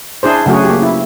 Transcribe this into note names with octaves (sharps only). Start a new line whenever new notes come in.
D4 E4 G#4 C5
C#3 F#3 A3 F#4 G#4
A#3 G4
E4